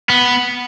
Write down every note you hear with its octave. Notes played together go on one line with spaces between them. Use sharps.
B3